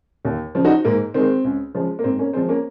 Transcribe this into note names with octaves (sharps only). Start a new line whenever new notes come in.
D#2
C#3 F3
D#4 F#4
G#2 A#3
D#3 G#3 C4
C#2
C#3 F3 G#3
A#3
G#2 C4
A#3 C#4
F3 G#3 C4
A#3 C#4